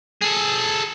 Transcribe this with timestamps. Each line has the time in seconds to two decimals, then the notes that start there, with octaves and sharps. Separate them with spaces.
0.22 G#4 A4